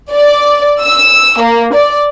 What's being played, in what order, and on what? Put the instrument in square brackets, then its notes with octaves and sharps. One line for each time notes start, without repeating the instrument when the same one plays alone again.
[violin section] D5
E6
A#3
D5